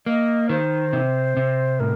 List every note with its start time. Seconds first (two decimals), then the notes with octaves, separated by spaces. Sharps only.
0.06 A#3 D#5
0.49 D#3 C5
0.93 C3
1.37 C3
1.79 A2 A#4